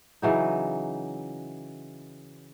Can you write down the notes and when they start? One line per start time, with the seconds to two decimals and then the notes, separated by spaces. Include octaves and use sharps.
0.22 C#3 E3 F#3 D#4